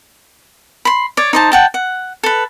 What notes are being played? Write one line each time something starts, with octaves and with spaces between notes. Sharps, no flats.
B5 C6
C#5 D5
D#4 C5 A5
F#5 G5 A5
F#5
A4 B4